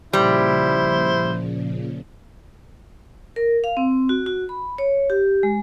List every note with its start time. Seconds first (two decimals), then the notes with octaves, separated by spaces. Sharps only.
0.13 A#2 C#3 F3 G3 E4 C5
3.36 A#4
3.64 F5
3.77 C4
4.09 F#4
4.26 F#4
4.49 B5
4.78 C#5
5.10 G4
5.43 G#3